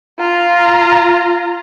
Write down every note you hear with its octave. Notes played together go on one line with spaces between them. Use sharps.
F4 A#5